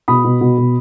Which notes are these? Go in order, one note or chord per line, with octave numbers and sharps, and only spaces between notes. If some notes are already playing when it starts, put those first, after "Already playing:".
B2 B5 D#6
B2
B2
B2